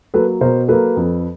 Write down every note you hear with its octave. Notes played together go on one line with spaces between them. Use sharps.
F#3 A#3 A4 B4
B2 A#4 C5
F#3 A#3 A4 B4
F2